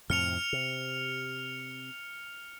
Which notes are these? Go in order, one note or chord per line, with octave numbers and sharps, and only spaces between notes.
F2 A2 C3 F6 C#7 F7
C3